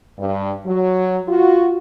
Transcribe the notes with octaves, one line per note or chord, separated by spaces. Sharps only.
G2
F#3
F4 F#4